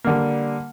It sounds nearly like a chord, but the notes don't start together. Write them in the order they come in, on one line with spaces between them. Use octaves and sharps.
A#3 D3 G3